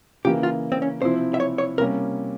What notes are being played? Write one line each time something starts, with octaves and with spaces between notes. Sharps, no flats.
C#3 E3 A#3 G4
F4
C4
C#4
C3 F3 C4 E4 C5
E5
C#5
C#5
C3 G3 A#3 C#4 A#4